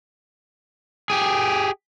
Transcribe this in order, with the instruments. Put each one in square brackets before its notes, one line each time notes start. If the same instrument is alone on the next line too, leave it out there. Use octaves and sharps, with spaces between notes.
[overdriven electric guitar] G4 G#4